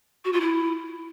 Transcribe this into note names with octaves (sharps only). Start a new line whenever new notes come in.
F#4
F4
E4